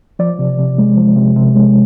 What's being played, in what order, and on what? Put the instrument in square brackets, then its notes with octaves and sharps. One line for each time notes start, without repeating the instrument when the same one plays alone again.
[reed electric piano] F3 D5
C3
C3
G#3
F3
C3
C3
G#3